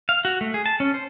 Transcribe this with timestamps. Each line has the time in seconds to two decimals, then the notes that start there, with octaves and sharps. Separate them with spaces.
0.09 F5
0.25 F#4
0.41 A3
0.54 G#4
0.66 A5
0.80 C#4
0.94 C5